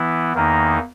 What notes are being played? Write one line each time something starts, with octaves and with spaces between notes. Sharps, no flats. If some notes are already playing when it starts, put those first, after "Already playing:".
Already playing: E3 B3 E4
E2 D#3 A#3 D#4